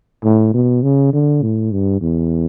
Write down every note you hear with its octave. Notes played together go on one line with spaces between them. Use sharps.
A2
B2
C#3
D3
A2
G2
E2